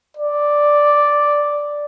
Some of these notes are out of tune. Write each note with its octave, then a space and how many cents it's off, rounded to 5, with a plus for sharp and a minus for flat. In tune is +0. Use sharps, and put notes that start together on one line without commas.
D5 +0